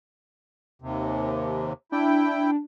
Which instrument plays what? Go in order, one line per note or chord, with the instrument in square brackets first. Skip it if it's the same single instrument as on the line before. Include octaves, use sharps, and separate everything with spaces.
[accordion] D#2 C3
[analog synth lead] D4 [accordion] E4 G5